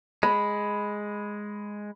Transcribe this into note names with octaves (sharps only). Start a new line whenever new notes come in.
G#3 B5